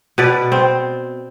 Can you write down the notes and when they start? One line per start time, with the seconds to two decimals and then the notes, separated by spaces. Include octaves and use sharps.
0.18 B2 B4 D5
0.52 C4